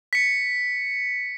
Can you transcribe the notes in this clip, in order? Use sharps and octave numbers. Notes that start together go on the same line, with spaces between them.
B6 C#7